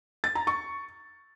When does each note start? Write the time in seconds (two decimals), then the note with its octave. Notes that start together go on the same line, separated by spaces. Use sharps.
0.24 A6
0.35 A#5
0.47 C#6